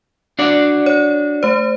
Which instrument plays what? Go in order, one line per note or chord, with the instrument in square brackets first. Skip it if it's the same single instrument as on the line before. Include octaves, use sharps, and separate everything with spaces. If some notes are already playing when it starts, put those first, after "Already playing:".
[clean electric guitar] D4 F#4 D5
[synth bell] C#5
A3 C5